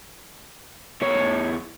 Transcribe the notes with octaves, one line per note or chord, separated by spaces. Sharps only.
E2 C#5